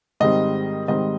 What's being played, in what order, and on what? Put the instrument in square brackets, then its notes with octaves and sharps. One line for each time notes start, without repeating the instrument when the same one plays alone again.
[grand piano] G#2 D#3 G3 C4 D#5
G#2 D#3 G3 C4 D#5